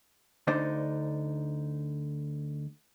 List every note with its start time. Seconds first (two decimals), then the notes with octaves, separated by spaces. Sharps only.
0.47 D2 D3 D4 D#4 C5 D5